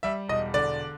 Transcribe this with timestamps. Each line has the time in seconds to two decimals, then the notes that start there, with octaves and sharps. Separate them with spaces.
0.03 G3 E5
0.29 E1 D#5
0.54 D3 D5